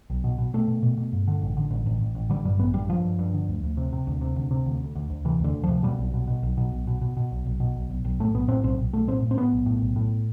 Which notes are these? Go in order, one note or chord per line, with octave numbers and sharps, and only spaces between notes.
B1
B2
B2
B2 A3
B2
B2
B2
G2
D3
A1
D3
A1
A1
A1
A1
D3 G3
G2 G3
A1 B3
G2 G3
G2 F3
G2
G2
D3
D2
D2
C3
C3
D2
C3
D2
C3
D2
D2
D2
D2
C3 E3
D2 D3
D2
F3
C3
B2 G3
B1
B2
B2
B1
B2
B1
B2
B2
B2
B1
B1
B2
B1
B1
B1
A2 A3
B1 B3
A2 C4
B1 C4
B1
B1 A3
A2 C4
A2
C4
A2 B3
B1
A2
B1
A2